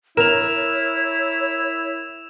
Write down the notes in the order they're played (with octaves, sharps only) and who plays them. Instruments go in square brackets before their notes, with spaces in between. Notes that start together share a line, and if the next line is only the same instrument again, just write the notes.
[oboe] E4 [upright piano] A#4 [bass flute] C#5 [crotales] E7 F7